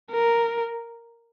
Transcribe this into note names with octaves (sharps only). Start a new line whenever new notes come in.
A#4